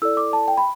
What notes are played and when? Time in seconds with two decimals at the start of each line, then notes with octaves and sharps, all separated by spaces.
0.02 E4 A4 D5 E6
0.17 D6
0.33 A5
0.48 G5
0.57 B5